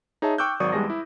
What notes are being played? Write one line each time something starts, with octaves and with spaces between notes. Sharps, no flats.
D#4 G#4 C#5 E5 A5
G5 C#6 D6 E6 F#6 G6
G#1 F#3 D5 C#6 D#6
E2 G3 G#3 A5 A#6
E4